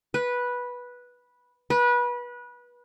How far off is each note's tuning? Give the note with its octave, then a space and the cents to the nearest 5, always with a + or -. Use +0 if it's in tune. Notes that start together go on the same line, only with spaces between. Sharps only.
B4 -10
B4 -25